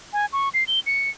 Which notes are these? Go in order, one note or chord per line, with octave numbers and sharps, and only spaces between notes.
G#5
C#6
C7
G7
C#7